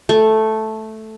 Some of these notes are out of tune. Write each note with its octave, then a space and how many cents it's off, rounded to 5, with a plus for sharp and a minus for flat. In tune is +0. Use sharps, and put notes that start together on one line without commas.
A3 -5